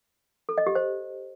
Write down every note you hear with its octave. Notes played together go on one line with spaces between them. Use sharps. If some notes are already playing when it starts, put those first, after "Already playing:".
A4
D#5
G4
C5